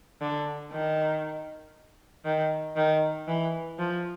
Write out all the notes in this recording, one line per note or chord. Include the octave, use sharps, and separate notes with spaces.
D3
D#3
D#3
D#3
E3
F3